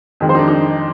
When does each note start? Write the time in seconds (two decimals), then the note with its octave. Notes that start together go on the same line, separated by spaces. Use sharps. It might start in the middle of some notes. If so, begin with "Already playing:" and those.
0.20 F2 D#3 G#3
0.29 C5
0.35 D#4
0.39 D4
0.48 D#4